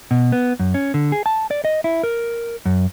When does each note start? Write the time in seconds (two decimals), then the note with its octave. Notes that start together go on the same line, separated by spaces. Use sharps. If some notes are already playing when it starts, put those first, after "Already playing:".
0.11 B2
0.32 B3
0.59 F#2
0.74 C#4
0.94 D3
1.12 G#4
1.26 A5
1.51 D5
1.65 D#5
1.84 E4
2.03 A#4
2.65 F#2